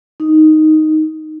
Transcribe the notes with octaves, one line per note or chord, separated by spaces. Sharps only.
D#4